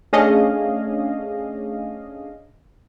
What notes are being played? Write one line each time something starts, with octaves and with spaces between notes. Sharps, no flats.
A3 C#4 D4 G#4 D#5 F5